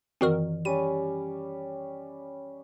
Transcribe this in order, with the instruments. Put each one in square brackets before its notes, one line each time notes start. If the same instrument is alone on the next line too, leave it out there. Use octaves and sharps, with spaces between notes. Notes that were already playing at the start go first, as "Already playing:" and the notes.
[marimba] F#2 D#3 E3 [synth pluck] C4 F#4 A#4
[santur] G3 C#4 [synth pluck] D#7